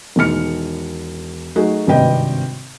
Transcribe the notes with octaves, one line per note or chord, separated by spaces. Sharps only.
E1 E2 D#3 F6 C#7
F#3 A3 D#4 F#4 G#4
G#1 G2 C3 B4 D#5 G5